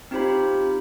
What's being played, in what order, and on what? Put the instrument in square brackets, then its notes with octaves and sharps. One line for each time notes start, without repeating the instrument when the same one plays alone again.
[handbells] C4 D#4 F4 G4 C5 B5